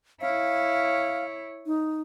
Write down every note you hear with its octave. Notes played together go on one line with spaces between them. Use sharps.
E4 C#5 F5
D#4